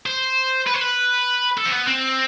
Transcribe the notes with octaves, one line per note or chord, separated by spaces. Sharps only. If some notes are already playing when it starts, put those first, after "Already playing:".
C5
B4
C5
B4
A4
C4
B3
C4